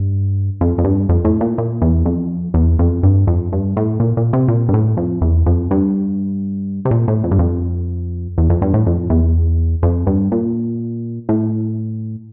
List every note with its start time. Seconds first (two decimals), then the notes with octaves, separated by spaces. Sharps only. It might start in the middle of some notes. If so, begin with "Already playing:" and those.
Already playing: G2
0.61 F2
0.78 F2
0.84 G2
1.09 F2
1.25 A2
1.41 A#2
1.58 A#2
1.82 E2
2.06 F2
2.54 E2
2.79 F2
3.03 G2
3.27 F2
3.52 G2
3.77 A2
4.00 A#2
4.17 A#2
4.33 C3
4.48 A#2
4.69 G2
4.74 A2
4.97 F2
5.21 E2
5.46 F2
5.71 G2
6.85 C3
6.91 A#2
7.08 A2
7.24 F2
7.31 G2
7.39 F2
8.38 E2
8.50 F2
8.62 G2
8.74 A2
8.86 F2
9.10 E2
9.83 F2
10.07 G2
10.32 A#2
11.29 A2